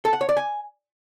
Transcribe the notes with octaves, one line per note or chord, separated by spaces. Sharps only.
A4
F#5
C#5
D5
G#5